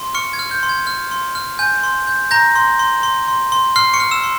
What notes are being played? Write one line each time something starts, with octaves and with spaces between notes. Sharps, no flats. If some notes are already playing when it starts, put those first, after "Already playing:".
Already playing: C6
C#6 F6 C#7
G#6
F6
G6
C6
G#6
F6
C6
F6
G#5 G6
C6
G6
A#5 G6 A#6
C6
C6
C6
C6
C6
C6 F6 C7
C#6 C#7
F6
E6 E7
C6